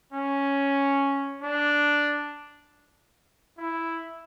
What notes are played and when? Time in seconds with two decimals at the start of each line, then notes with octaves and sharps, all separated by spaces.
0.12 C#4
1.42 D4
3.58 E4